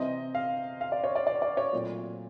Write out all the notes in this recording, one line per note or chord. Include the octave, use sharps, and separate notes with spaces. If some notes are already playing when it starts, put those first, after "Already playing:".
Already playing: C3 E3 G3 C4 D#5
F5
F5
D5
C#5
D5
D5
D5
C#5
A#2 F#3 A3 C4 F4